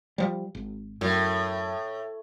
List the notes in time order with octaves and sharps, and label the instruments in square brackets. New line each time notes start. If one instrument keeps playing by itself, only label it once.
[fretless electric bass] F3 G3
G#1
[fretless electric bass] F#2 [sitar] A2